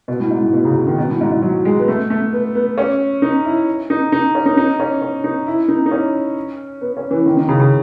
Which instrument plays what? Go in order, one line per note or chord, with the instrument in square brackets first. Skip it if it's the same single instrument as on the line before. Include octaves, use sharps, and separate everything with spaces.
[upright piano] B2
A2
G#2
A2
B2
C#3
C#3
D#3
B2
A2
G#2
G#2
F#3
G#3
B3
A3
A3
B3
B3
C#4
D#4
E4
D#4
D#4
C#4
D#4
D#4
C#4
C#4
D#4
E4
D#4
D#4
C#4
B3
C#4
E3
D#3
D#3
C#3
C#3